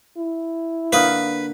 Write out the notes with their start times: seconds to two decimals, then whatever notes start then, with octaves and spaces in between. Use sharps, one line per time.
0.17 E4
0.93 D3 A#3 B4 F5 D#6 F6